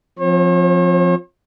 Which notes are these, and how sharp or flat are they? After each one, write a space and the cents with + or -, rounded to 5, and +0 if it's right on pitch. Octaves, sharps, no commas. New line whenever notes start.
F3 +10 C4 +0 C#5 -45